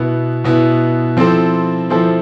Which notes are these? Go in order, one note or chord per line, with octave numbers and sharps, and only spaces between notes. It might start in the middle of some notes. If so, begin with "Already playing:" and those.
Already playing: B2 B3 E4
B2 B3 E4
F3 C4 E4 A4 C5
F3 C4 E4 A4 C5